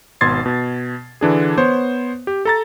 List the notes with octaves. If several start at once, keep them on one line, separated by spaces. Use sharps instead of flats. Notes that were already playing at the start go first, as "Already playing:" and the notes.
G#1 B2 C6 G#6 A6 C7
B2
D3 E3 D4 G#4
B3 C5 C#5
G4
A4 A#5 A6